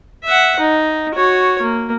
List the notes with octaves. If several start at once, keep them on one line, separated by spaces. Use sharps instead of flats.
E5 F#5
D#4
F#4 C#5
A#3